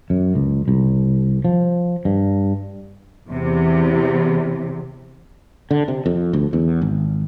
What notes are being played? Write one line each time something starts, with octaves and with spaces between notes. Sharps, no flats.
F#2
C#2
C2
F3
G2
E2 C3
D3
C3
F2
D2
E2
G#1